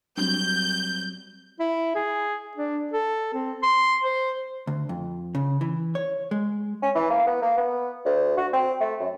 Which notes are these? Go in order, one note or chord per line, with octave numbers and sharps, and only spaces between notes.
F#3 G3 C4 G6
E4
G#4
D4
A4
C4
C6
C5
D2
F2
C#3
E3
C#5
G#3
C#4
E3
A#3
B3
A#3
B3
D2
F#4
C4
A3
F#2